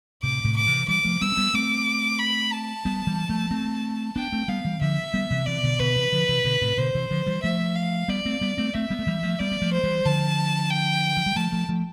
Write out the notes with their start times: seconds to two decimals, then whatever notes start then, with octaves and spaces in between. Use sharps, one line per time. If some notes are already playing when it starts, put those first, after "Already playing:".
0.23 A2 C3 D6
0.44 A2 C3
0.56 D6
0.67 C3 E3
0.88 E3 G3 D6
1.04 F3 A3
1.21 G3 B3 E6
1.32 C4
1.37 G3 B3
1.54 A3 C4 D6
2.19 B5
2.52 A5
2.85 G3 B3
3.07 E3 G3
3.29 F3 A3
3.51 A3 C4
4.16 B3 D4 G5
4.33 A3 C4
4.48 G3 B3 F5
4.65 E3 G3
4.81 D3 F3 E5
5.14 G3 B3
5.30 C3 E3
5.46 C3 E3 D5
5.63 B2 D3
5.79 B2 D3 B4
5.96 C3 E3
6.12 D3 F3
6.29 C3 E3
6.45 B2 D3
6.62 A2 C3
6.78 B2 D3 C5
6.95 C3 E3
7.11 D3 F3
7.26 E3 G3
7.43 F3 A3 E5
7.76 F5
8.08 G3 B3 D5
8.25 A3 C4
8.41 G3 B3
8.58 A3 C4
8.74 A3 C4 E5
8.90 G3 B3
8.99 A3
9.07 E3 G3
9.23 F3 A3
9.39 G3 B3 D5
9.51 B3
9.62 F3 A3
9.73 C5
9.84 E3 G3
10.05 D3 F3 A5
10.70 G5
11.17 F3
11.26 G3
11.36 F3 A3 A5
11.52 F3 A3
11.69 F3 A3